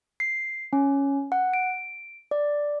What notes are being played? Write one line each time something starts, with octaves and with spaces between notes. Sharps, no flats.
C7
C#4
F#5
D7
D5